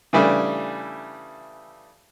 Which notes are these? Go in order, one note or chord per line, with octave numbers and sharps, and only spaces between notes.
C#3 E3 G3 A3 D4